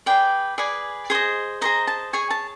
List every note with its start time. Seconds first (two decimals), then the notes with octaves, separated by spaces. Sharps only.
0.06 G#4 B4 D5 G5
0.58 G#4 B4 D5 G#5
1.10 G#4 C5 D#5
1.61 G#4 C5 D#5 A#5
1.87 A5
2.13 G#4 C#5 G#5
2.30 A5